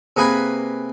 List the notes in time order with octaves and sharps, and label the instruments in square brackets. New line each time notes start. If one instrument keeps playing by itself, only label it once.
[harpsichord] C3 A#3 G#4 B4 G#5 B5